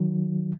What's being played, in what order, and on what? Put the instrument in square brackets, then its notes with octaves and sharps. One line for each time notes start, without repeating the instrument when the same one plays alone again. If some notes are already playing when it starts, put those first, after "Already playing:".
Already playing: [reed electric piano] D#3 F#3